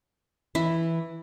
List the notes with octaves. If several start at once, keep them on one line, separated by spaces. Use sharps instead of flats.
E3 E4